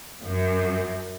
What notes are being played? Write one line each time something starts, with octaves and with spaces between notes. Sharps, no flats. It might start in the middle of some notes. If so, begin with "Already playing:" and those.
F#2